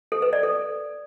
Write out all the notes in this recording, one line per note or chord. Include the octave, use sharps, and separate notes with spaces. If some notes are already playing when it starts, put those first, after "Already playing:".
A4
B4
D5
A4